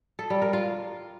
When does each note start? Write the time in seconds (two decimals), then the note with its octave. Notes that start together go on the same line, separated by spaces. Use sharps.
0.19 A4
0.30 G3
0.42 A#4
0.53 F4